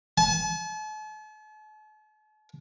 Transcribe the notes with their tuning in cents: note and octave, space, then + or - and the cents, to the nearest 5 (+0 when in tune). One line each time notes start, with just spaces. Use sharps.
A5 -45